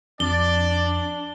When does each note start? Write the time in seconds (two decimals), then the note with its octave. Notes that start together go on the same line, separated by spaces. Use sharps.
0.20 F2 D4 D5 G7